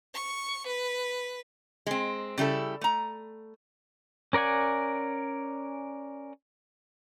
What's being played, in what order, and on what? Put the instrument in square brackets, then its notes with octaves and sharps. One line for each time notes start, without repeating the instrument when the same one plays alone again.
[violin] C#6
B4
[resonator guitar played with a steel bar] G#3 C4
C#3 G3 E4 A4
A3 A#5
[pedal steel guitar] C#4 A#4 D5 F#5 G#5